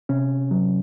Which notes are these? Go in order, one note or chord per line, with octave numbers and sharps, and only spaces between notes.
C3 C#4
F#3